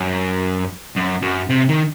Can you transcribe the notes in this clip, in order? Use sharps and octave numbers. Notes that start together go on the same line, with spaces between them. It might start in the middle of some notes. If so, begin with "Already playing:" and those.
Already playing: F#2
F#2
F#2
C3
D#3